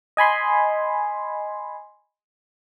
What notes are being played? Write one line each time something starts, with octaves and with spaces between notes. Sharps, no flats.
D#5 G#5 B5 C6